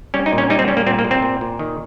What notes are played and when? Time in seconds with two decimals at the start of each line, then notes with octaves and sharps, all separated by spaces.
0.14 G3 C#4
0.26 D#4
0.33 A#2
0.38 C#4
0.50 G3 D#4
0.59 C4
0.68 G3 C#4
0.77 A#3
0.87 A#2 C4
0.99 A#3
1.04 A#2
1.11 C4
1.22 A#2
1.41 A#2
1.59 D#3